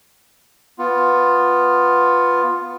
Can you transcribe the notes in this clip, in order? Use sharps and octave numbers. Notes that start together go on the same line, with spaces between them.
B3 F4